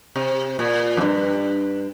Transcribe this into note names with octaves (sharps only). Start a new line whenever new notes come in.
C3
A#2
F2
G2